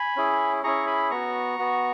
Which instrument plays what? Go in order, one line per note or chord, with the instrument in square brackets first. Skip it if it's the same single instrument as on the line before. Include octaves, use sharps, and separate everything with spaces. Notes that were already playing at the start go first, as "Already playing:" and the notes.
Already playing: [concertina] G#5 B5
C#4 E4 G#4
C#4 E4 G#4 A#5 C#6
G#5 B5
B3 F#4 A#5 C#6
B3 F#4